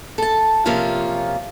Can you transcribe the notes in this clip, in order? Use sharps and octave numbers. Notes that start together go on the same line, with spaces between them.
A4 A5
C3 F3 A#3 C#4 F4